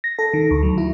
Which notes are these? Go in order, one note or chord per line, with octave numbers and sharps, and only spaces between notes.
A#6
A4
D#3
D2
F#3
E4